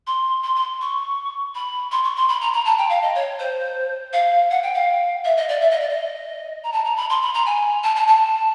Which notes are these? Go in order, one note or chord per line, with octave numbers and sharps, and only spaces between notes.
C6
C6
C6
C#6
B5
C6
C#6
C6
B5
A#5
A#5
A5
G5
F5
D#5
C#5
C5
F5
F#5
G5
F5
E5
D#5
D5
E5
D#5
D5
D#5
A#5
A5
A#5
B5
C6
B5
A#5
G#5
A5
A5
A5